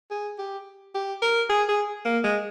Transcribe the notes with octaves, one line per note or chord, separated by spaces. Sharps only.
G#4
G4
G4
A#4
G#4
G#4
A#3
G#3